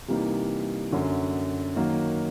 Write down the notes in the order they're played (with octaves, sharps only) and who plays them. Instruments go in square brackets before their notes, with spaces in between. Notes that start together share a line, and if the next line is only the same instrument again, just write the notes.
[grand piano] C3 E3 G3 A#3 D#4
F#2 D3 F#3
D#3 F#3 A#3